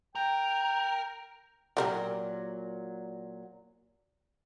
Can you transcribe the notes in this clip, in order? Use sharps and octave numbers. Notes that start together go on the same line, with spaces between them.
A#4 G5
A#2 F3 F#3 G4 A#4